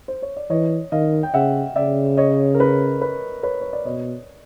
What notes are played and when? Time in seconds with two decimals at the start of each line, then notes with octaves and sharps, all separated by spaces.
0.08 C5
0.22 C#5
0.37 D5
0.50 E3 C#5 D#5
0.92 D#3 D#5 F5
1.23 G5
1.34 C#3 E5 F#5
1.76 C#3 D5 E5
2.17 C#5 D#5
2.55 A#4
2.60 B4
3.02 B4
3.43 B4 C#5
3.61 C#5
3.73 D5
3.85 B2 C#5 D#5